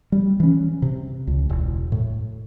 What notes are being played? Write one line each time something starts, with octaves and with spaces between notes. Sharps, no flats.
G3
E3 C#4
C3
C#2
E1
A2